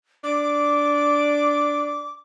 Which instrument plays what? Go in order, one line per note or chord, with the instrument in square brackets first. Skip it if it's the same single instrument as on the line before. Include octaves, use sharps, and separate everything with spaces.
[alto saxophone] D4 [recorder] D6